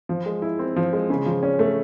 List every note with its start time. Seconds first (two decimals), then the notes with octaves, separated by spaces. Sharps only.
0.09 F3
0.26 G#3
0.42 E4
0.59 C4
0.76 F3
0.93 G#3
1.10 C#3
1.26 F3
1.43 C#4
1.59 A3